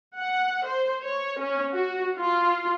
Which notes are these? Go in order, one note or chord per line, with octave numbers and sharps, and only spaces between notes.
F#5
C5
C#5
C#4
F#4
F4